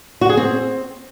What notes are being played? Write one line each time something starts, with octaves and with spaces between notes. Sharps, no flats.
F#4
G#4
C4